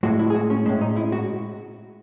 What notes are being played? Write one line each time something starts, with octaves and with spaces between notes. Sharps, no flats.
A2 G#3 F#4
E4
G#4
F#4
C#4
A2 G#3 C#4
D#4
E4
F#4